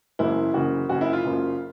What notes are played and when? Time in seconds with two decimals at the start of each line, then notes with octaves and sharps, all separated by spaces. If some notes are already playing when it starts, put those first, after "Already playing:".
0.19 F#1 F#2 C#3 E3 E4
0.54 F#1 F#2 C#3 E3 F#4
0.89 F#1 F#2 C#3 F#4
1.01 E4
1.13 F4
1.25 F#1 F#2 C#3